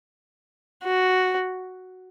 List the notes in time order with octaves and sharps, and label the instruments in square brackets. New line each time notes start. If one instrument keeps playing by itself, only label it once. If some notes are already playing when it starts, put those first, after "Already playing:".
[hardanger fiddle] F#4